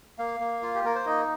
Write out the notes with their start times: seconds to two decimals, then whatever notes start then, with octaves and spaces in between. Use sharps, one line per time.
0.19 A#3 F5
0.40 A#3
0.62 F4
0.75 G4
0.85 A#3 A#4
0.95 C5
1.06 D#4 D#5